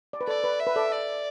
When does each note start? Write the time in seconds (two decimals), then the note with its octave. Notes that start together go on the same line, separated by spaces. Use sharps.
0.13 D5
0.21 B4
0.28 A4 D5
0.44 B4
0.60 E5
0.67 B4
0.76 A4 D5
0.92 D5